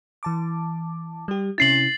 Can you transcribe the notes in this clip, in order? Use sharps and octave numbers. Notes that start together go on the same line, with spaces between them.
E3 A5 D6
G3 G4
C3 C#4 E4 A6 C7 F#7